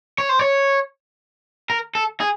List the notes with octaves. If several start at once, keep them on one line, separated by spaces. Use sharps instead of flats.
C#5
C5
C#5
A#4
A4
G#4